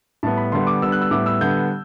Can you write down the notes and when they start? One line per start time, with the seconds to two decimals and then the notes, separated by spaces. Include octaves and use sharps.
0.23 A2 G3 B3 A5
0.37 B5
0.52 D3 G3 B3 C6
0.67 D6
0.82 D3 G3 B3 E6
0.92 F#6
1.02 E6
1.11 A2 G3 B3 D6
1.26 E6
1.41 D3 G3 B3 G6